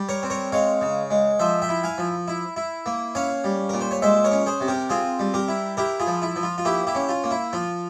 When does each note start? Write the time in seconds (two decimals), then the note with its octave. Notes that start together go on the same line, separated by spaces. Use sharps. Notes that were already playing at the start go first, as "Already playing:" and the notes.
Already playing: G3
0.09 A#4 C#5
0.23 C4
0.30 A#4 C#5
0.52 G#3 C#5 F5
0.81 C#3
1.10 G#3
1.39 F3 C5 E5
1.62 E5 G5
1.69 E4
1.83 F5 G#5
1.98 F3
2.28 E4
2.56 E4
2.86 A#3
3.15 C#4 C#5 F5
3.44 G3
3.69 A#2 A#4
3.81 C5
3.91 C#5
4.02 G#3 C5 E5
4.24 A#4 C#5
4.32 C#4
4.46 G#4 C5
4.61 C3
4.68 G4 A#4
4.90 C4 F4 G#4
5.19 G3
5.34 G4 A#4
5.48 E4
5.77 E4 G4 A#4
6.00 F4 G#4
6.07 F3
6.22 E4
6.36 F3
6.43 F4
6.58 F4
6.65 A#3 E4 G4
6.87 E4 G4
6.95 C#4
7.09 F4
7.24 A#3
7.31 E4
7.53 F3 F4